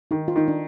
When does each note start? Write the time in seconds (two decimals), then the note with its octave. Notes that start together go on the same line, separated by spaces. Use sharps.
0.11 D#3 D#4
0.28 F4
0.36 D#3 D#4
0.48 D4